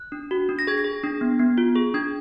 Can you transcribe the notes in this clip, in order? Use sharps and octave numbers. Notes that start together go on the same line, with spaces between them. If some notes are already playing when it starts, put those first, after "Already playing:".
Already playing: F#6
D4
F#4
D4
A#6
G#4 G#6
A#6
G#4
D4
B3
B3
F4
G#4
D4 G#6